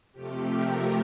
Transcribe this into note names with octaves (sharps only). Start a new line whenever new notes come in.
F2 C3 F3 A3 G4
A#4